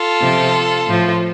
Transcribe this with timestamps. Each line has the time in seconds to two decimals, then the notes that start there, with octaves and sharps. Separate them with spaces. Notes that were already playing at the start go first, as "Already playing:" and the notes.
Already playing: F4 A4
0.21 C3 F3
0.87 A2 F3